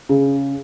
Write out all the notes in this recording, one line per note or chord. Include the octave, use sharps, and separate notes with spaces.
C#3